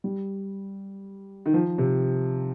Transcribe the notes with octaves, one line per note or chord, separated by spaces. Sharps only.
G3
D#3
F3
C3